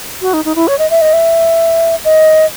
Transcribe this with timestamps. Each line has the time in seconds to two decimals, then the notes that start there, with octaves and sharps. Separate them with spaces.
0.22 F#4
0.33 D#4
0.45 D#4
0.55 E4
0.68 C#5
0.79 D#5
0.90 E5
1.01 D#5
1.13 E5
2.05 D#5